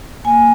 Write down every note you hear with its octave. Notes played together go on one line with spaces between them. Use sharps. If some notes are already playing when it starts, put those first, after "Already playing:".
A#3 G#5